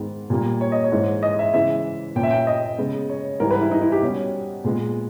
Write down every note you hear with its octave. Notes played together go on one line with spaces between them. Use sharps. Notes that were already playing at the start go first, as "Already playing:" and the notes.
Already playing: G#2 D#3 G#3 B3
A#2 G3 A#3
C#5
D#5
C#5
G#2 E3 G#3
D#5
E5
C#3 E3 G#3 E5
A#2 A#3 C#4 G5
E5
G5
D#5
C#3 G#3 B3
C#5
G#2 E3 G3 A#4
B4
E4
D#4
E4
G4
B2 G3 C#4
A#2 G#3 B3